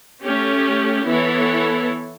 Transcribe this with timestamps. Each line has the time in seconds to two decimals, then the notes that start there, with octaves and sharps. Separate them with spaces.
0.23 A3 C#4 G4
1.06 E3 B3 E4 A4 C#5